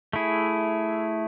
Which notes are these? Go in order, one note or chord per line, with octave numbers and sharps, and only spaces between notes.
A3 E4 G#4